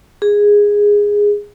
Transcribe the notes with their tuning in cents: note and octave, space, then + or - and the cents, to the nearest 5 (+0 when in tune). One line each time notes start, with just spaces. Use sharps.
G#4 -10